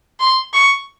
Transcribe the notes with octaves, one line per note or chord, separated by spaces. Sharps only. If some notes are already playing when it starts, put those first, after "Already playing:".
C6
C#6